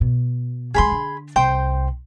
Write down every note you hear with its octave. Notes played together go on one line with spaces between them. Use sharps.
B2
D3 G#3 G#4 B5 C6
D3
C2 C5 G5 C6